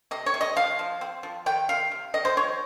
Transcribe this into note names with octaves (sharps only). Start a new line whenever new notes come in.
C3 D#5
C#5
C3
D#5
F3 F5
F3
C4
F3
D#3 G5
C3 F5
C3
D#3 D#5
C5
F3 C#5